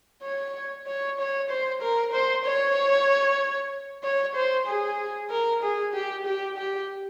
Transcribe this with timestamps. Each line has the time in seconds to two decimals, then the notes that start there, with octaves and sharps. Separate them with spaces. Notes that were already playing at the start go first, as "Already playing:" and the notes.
0.23 C#5
0.87 C#5
1.19 C#5
1.50 C5
1.81 A#4
2.13 C5
2.45 C#5
4.03 C#5
4.35 C5
4.67 G#4
5.31 A#4
5.63 G#4
5.94 G4
6.26 G4
6.57 G4